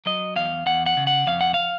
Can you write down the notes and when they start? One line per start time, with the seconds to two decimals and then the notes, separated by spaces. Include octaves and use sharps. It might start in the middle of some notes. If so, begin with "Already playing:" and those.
0.06 F#3 D#5
0.36 E2 F5
0.66 E2 F#5
0.86 F#5
0.97 C#3
1.07 F#5
1.27 F2 F5
1.41 F#5
1.54 F5